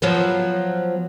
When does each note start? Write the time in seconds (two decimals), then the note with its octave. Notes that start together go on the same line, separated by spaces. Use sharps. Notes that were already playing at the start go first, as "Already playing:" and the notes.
0.02 F3 F#3 B3